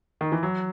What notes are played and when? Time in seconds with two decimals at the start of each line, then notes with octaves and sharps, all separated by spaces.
0.21 D#3
0.32 E3
0.43 F#3